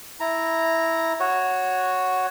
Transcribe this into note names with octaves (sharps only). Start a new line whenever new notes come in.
E4 A#5
F#4 C#5